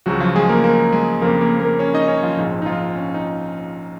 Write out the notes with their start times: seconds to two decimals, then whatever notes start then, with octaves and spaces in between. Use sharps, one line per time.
0.06 C#2 C#3 F3 F#3 F#4
0.20 F3 F4
0.36 G#3 G#4
0.49 A#3 A#4
0.64 A#3 A#4
0.92 G#3 G#4
1.21 F2 C#3 F3 A#3 A#4
1.41 A#3 A#4
1.60 A#3 A#4
1.79 C#4 C#5
1.94 D#4 D#5
2.08 C#4 C#5
2.23 F3 F4
2.37 A#1 G#2 F3 D#4
2.62 D#4
2.66 F3 F4
2.95 C#4
3.14 D#4